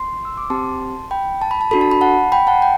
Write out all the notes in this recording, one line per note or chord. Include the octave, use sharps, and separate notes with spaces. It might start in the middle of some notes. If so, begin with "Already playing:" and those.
Already playing: C6
E6
D6
C4 G4 A5 C6
G5 B5
A5
B5
A5
D4 F#4 A4 B5
A5
B5
F#5 A5
G5 B5
F#5 A5
G5